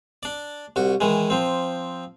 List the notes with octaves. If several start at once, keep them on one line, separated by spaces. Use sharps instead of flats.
D4 D5
C2 F#4
D#3 E3 G#3
F3 C4